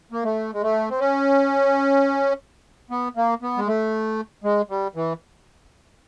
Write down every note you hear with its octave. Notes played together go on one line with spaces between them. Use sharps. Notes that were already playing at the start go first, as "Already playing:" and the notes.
A#3
A3
G#3
A3
C4
C#4
B3
A#3
B3
G#3
A3
G#3
G3
E3